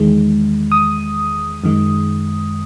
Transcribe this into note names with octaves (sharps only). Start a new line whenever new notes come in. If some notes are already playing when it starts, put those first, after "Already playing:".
Already playing: E2 D#3 G#3
D#6
F#2 D#3 G#3